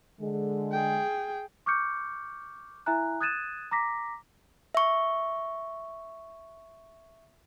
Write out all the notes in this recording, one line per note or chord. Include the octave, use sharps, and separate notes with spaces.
D3 G#3
G#4 G5
C#6 D6 F6 G6 C#7
E4 E5 G#5 A#5 F#6
D#6 F#6 G#6 A6 D#7 E7
A#5 D6 A#6 B6
E5 C#6